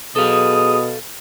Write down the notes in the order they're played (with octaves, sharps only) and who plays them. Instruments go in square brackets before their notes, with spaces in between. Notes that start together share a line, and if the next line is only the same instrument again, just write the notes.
[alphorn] B2 [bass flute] G#4 [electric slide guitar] A4 F5 [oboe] D#6